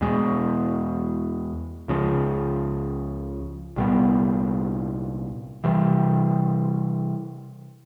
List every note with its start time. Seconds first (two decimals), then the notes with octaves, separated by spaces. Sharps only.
0.01 E2 B2 G#3
1.88 C#2 C#3 F3 G#3
3.76 C2 A#2 G3 B3
5.64 C3 E3 G3